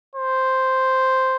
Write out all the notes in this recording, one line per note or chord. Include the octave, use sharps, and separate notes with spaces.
C5